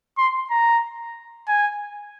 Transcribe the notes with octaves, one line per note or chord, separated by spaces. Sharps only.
C6
A#5
G#5